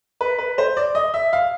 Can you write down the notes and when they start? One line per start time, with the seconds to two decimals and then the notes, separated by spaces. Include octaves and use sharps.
0.21 B4
0.39 B4
0.58 C5
0.77 D5
0.95 D#5
1.14 E5
1.33 F5